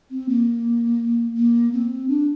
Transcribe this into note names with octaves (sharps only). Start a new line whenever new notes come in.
C4
A#3
A#3
C4
D4